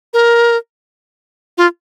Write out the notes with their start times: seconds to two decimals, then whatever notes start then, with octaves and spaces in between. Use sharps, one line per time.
0.14 A#4
1.58 F4